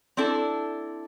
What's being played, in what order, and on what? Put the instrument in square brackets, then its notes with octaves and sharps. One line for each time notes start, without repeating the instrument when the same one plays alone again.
[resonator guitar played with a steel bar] C4 D4 E4 A4